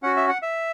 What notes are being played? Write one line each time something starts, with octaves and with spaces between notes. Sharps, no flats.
C#4 F#4 F#5
E5
F#5
E5